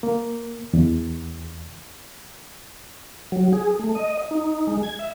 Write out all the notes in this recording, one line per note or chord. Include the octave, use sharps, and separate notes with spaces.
A#3
E2
F#3
G#4
A3
D#5
D#4
G#3
G#6
E5